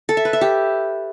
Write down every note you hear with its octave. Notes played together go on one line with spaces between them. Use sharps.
A4
E5
B4
E5
G4